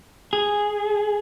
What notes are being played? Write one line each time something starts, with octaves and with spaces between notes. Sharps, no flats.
G#4